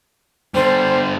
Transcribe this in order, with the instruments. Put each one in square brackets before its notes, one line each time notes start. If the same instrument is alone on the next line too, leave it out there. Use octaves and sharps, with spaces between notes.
[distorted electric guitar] D3 G3 [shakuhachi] C5